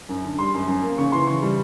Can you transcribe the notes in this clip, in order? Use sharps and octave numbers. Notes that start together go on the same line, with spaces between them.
F#2
D3
G3 C6
F#2
F#2
A#3
C#3 C#6
E3 C6
C#3 C#6
G3